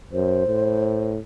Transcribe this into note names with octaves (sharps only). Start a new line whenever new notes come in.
F#2 C5
A2